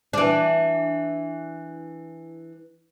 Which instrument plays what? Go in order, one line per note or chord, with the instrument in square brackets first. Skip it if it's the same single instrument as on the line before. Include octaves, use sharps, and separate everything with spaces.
[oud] E3 D4